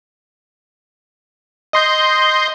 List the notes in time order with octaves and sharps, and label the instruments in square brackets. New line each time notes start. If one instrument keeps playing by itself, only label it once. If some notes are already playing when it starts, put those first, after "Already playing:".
[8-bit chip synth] D#5 C6 G6